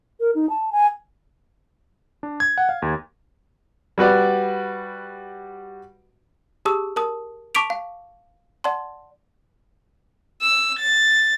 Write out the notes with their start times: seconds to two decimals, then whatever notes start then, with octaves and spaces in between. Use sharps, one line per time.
0.20 A#4
0.35 D#4
0.50 A5
0.72 G#5
2.23 D4
2.40 G#6
2.58 F#5
2.69 F5
2.82 D#2
3.98 G3 F#4 B4 D5
6.65 G4 G#4 A5 C#6 D#6 E6
6.96 A#4 A5 D#6
7.55 A5 C#6 D6 B6 D7 F7
7.70 F5
8.64 D5 F#5 A5 C6
10.42 E6
10.79 A6